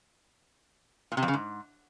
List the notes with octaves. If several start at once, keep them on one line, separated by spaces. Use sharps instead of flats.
A#2
C3
F2
C#3
G#2